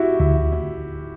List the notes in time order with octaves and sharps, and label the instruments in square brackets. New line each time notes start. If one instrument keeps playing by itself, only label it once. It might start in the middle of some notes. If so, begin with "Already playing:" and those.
Already playing: [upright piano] E4 F#4 G4
[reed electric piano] D2 [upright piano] E4